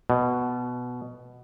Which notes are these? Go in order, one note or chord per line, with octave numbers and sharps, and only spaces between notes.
B2